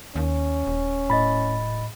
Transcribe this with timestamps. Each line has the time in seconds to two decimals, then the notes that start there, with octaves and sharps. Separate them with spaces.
0.16 D#2 C#4
0.67 D#1
1.10 A2 D#5 B5 A6